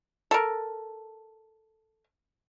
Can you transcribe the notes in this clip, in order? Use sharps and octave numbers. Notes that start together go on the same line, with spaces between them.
A4 A#4